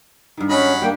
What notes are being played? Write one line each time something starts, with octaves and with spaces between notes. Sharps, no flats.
G2 D#3
F#3 C#4 D#5 B5
G3 A#3 D4 G4 G5